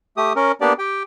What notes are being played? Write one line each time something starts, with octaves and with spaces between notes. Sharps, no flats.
A3 G4 D#6
C#4 A#4
A#3 B3 D4 G4 D5
G4 G5